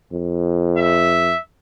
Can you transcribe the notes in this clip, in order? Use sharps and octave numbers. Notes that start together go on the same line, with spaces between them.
F2
E5